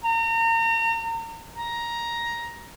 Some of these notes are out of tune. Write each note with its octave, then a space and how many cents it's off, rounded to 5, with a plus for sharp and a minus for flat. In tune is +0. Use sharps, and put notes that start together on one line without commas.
A#5 -35
A#5 +10